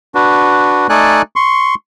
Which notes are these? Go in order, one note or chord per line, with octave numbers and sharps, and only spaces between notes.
D4 F#4 B4
A3 D#4 A4 D5 G#5 F#6
C6 C#6